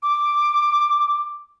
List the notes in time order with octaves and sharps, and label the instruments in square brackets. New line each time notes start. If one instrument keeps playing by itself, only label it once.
[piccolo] D6